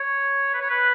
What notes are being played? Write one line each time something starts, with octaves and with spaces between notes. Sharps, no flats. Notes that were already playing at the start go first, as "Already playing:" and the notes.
Already playing: C#5
B4
C#5
B4